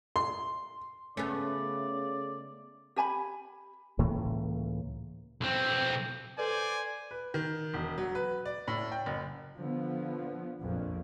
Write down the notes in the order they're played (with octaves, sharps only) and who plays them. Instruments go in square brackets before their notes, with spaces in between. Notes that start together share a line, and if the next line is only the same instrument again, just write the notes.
[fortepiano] C6
[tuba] C#3 [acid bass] A3 [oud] B3 C#4 [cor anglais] D5
[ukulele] G4 G#5 A5 B5
[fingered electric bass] C#2 A2 E3 A#3
[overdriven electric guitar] B1 C4
[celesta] A4 B4 [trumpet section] C5 D5 [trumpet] G#5
[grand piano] B4
D#3
E1
F#3
B4
D5
A2
G5
F#1
[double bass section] D3 F3 B3
A#1 F2